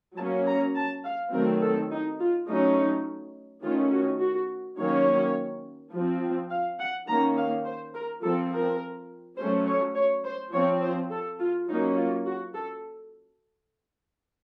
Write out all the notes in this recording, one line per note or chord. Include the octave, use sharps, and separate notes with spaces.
F#3 A#3 C#4 A5
A#5
A5
F5
D#3 F#3 A3 C4 A#4
A4
D#4
F4
F#3 A3 C#4 D#4
D#3 A3 C#4 F4
F#4
F#4
D#3 F#3 A#3 C#4 C#5
F3 C4
F5
F#5
D#3 A#3 C#4 A#5
F5
C5
A#4
F3 C4 A4
A#4
F#3 A3 C#4 C5
C#5
C#5
C5
F3 C4 C#5
C5
A4
F4
F#3 A#3 C#4 D#4
F4
F#4
A4